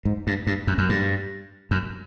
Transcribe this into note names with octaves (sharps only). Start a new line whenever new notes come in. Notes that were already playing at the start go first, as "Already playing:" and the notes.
G#2
G2
G2
F#2
F#2
G2
F#2